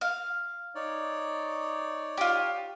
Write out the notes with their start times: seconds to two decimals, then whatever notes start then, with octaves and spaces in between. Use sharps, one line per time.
0.01 F5
0.75 D#4 C#5 D5
2.17 F4 G4